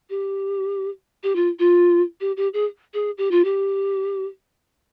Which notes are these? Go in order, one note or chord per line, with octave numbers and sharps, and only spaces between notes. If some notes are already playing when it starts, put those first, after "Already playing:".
G4
G4
F4
F4
G4
G4
G#4
G#4
G4
F4
G4